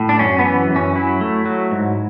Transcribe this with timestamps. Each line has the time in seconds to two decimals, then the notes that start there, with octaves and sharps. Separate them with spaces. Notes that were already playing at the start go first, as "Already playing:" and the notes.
Already playing: A2
0.09 D4
0.19 F#2 C#4
0.39 B3
0.45 E3
0.70 F#2
0.76 C#4
0.96 F#3 E4
1.21 A3
1.45 F#3
1.71 G#2